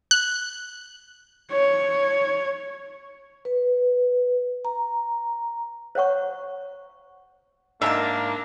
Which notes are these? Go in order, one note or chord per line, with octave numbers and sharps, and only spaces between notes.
F#6
C#5
B4
A#5
C5 C#5 F#5 C#6
G#2 A#3 D4 E5 G#5 A5